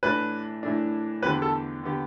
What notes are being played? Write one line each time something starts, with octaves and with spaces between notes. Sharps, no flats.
A2 E3 A3 D4 B4
A2 E3 A3 D4
E2 D3 B3 G4 B4
A4
D3 B3 G4